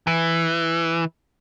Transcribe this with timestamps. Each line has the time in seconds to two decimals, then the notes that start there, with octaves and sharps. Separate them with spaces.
0.07 E3